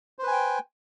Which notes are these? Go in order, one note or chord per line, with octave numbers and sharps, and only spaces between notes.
B4 C5 G5 G#5